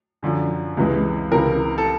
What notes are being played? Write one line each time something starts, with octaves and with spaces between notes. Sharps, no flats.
F#2 D3 F3
C#2 C3 E3 G#3
C#2 C3 E3 A#4
A4